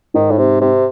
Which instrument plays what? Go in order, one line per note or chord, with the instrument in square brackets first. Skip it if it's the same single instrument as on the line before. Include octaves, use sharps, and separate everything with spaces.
[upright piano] G#2 [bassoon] D#3
[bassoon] A2
[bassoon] C3 [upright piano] C4
[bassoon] C3 [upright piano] C4